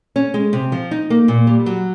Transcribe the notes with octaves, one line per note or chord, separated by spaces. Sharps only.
C#4
G#3
C3
F3
D#4
A#3
A#2
G3
F#3